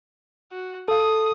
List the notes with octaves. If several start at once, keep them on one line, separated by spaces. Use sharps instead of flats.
F#4
A4 F5 D#6